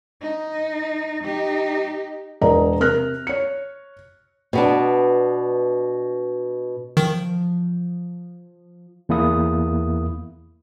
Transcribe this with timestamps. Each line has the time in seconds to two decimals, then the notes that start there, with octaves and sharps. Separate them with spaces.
0.21 D#4
1.24 D#4 G4
2.41 E1 A#4 D5 D#5 A#5
2.80 C3 A#4 F6 F#6 A#6
3.27 C#5 C#7
4.53 B2 B3 D4
6.97 D#3 F3
9.09 E2 A#3 E4 D#6